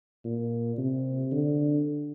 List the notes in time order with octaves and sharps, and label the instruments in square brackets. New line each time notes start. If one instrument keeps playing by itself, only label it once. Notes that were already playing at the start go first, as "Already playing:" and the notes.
[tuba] A#2
C3
D3